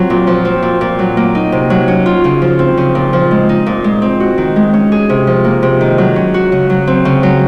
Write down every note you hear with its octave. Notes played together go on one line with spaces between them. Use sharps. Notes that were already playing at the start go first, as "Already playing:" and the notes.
Already playing: F#3 C4 F4
A#2
F3
C4
A#2
A#2
F#3
A#3
D#4
C3
F#3
C#4
F4
C#3
F3
C4
C#3
A#2
F3
G#3
D#4
A#2
G#3
C4
F#4
D#3
G#3
C#4
G#4
C3
F3
A#3
C3
D#3
F#3
C#4
F#4
C#3
F#3
C4
C#3
F#3